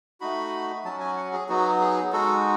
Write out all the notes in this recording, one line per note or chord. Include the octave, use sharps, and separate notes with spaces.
A3 D#4 F#4 B5
F#3 C#4 F#4 A5
G#5
F#5
G#4
F#3 B3 D#4 F#4
G#4
G#3 D#4 F#4 A4